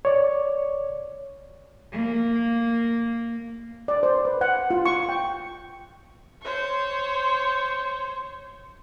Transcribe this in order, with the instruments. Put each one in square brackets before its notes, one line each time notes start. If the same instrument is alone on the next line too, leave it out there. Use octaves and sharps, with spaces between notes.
[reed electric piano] C#5 D5
[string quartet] A#3
[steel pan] D5
C5
B4
F#5
F4
C#6
G5
[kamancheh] C5 C#5